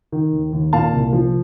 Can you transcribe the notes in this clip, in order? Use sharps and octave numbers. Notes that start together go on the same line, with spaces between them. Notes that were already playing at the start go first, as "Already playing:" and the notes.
D#3
D#2
D#2
A#2 F5 A5
C2
F3